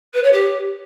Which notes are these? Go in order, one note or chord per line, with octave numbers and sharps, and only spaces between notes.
B4
C#5
G4